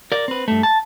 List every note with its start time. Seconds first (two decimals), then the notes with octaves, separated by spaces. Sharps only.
0.12 A#4 D5
0.28 C4 B4
0.48 G2 A3
0.63 A5